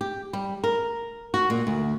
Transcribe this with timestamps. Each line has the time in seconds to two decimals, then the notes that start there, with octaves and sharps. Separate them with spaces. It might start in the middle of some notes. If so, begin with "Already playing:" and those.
0.01 G4
0.33 G3
0.64 A#4
1.34 F#4
1.50 A#2
1.67 D2